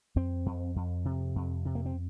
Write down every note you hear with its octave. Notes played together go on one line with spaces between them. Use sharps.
F2 C4
F2
F2
C3
F2
C3
A#3
C4